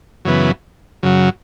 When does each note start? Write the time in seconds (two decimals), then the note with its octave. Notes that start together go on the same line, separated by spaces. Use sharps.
0.25 F#2 C#3 E3 B3
1.03 F#2 C#3 F#3